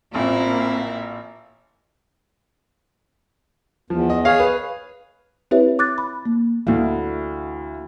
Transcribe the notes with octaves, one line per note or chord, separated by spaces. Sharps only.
A1 A#2 A#3 C4 E4 A#4 F5
E2 F3
D#5
G#4 C#5 F5
B4
C4 E4 G4 B4 C#5 E5
D6 F#6 A6
B5
A#3
D2 E3 E4 F#4 F5